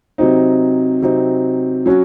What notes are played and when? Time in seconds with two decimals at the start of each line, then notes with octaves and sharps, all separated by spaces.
0.18 C3 F#3 C4 D#4
1.02 C3 F#3 C4 D#4
1.86 F#3 C#4 F#4